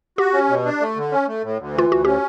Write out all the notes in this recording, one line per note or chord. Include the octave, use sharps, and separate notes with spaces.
F#4 G4
C#4
B2
D4
A3
D3
C#4
A3
A2
D2
E3 F4
D2 F#4
C#4 G4